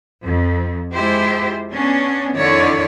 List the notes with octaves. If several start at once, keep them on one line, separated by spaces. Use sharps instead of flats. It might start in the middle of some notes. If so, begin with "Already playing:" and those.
F2
G#3 E4 F4 G4 C5
B3 C#4 D4
F2 D3 D#3 E4 C#5 D5